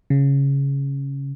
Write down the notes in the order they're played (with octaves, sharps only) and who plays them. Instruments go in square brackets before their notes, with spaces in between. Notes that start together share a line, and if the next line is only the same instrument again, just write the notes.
[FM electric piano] C#3